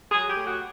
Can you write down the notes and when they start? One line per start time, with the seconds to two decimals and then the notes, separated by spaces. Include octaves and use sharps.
0.12 F#3 G#4
0.30 G4
0.35 A2
0.47 F#4